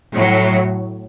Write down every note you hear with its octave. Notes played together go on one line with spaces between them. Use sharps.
A2 F#3